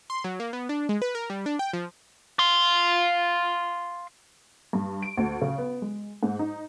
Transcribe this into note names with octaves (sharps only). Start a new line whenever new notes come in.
C6
F#3
A#3
B3
D4
G#3
B4
A#4
G3
D4
G5
F3
F5 C6
G2
D7
D2
C#3
B3
G#3
G#2
D#4